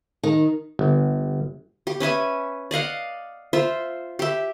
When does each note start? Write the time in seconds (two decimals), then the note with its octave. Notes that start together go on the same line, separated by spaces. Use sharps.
0.23 D#3
0.79 G1
1.87 G4
2.00 C#4 B4 E5 G#5
2.71 D5 D#5 F5 F#5
3.53 F4 C5 E5
4.19 G4 E5